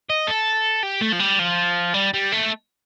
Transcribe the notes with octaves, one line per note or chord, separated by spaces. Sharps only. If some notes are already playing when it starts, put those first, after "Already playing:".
D#5
A4
G4
A3
F3
G3
F3
G3
G3
A3